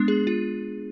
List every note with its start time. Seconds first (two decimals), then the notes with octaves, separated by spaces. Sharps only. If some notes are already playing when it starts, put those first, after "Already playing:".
Already playing: G#3 B3 D4
0.08 G#4
0.27 F4